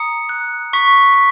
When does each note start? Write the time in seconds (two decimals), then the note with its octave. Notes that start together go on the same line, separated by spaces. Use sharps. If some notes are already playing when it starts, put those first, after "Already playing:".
Already playing: A#5 D#6 C#7
0.29 F#6
0.73 C#6 B6
1.14 B6